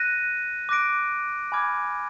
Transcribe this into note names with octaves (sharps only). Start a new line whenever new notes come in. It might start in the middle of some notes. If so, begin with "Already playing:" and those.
Already playing: F#6 A#6 D#7
D6 F#6 A#6 D7
G#5 B5 D6 F6 G#6